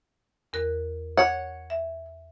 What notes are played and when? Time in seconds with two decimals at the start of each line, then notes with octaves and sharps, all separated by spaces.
0.53 E2 A#4 F#6
1.17 C#5 F#5
1.70 E5